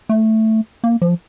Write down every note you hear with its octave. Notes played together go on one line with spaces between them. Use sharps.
A3
A#3
F3